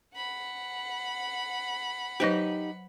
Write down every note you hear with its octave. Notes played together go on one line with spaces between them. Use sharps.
F#5 B5
F#3 D#4 G4 B4 C5